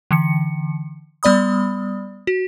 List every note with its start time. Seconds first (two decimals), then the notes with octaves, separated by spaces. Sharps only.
0.11 D3 E3 C#7
1.23 G3 B3 D5 B5 D#6
2.27 F#4